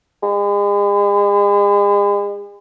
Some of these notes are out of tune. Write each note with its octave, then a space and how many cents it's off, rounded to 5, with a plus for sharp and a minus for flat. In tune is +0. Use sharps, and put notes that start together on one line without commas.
G#3 -40